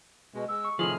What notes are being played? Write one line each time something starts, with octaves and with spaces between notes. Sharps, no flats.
B2 G#3
G#3 E6
C#6
A2 C3 D#3 F3 G#4 F6 F#7